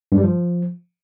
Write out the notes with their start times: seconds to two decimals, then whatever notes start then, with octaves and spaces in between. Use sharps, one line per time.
0.12 G2
0.18 G3
0.24 F3